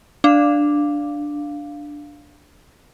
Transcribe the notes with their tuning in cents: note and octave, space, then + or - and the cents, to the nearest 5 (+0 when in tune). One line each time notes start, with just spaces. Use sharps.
D4 +0 F5 +0